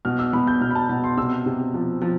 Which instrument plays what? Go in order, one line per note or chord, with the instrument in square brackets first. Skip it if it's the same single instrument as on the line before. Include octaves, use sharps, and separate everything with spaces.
[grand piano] B2 F6
E6
B2 B5
G6
B2 F6
B5
A5
B2 B5
C6
C3 E6
C3
F3
F3